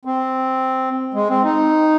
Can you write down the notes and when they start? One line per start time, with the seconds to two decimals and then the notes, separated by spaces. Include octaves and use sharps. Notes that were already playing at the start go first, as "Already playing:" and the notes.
0.05 C4
1.14 G#3
1.29 C4
1.44 D#4